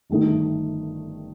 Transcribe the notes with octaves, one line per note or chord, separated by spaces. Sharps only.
G1 G2 D#3 A3 D#4